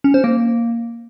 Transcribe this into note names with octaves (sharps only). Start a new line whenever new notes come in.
C#4
C5
A#3